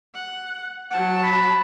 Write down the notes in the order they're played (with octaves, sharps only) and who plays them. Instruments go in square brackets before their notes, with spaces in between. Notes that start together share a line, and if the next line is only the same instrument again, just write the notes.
[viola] F#5
[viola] F#3 A5 [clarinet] F#5
[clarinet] B5